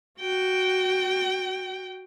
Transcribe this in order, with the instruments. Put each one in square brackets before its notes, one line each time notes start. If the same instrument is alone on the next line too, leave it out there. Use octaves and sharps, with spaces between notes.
[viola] F#4 G5